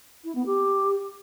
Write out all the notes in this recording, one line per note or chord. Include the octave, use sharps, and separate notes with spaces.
E4
B3
G4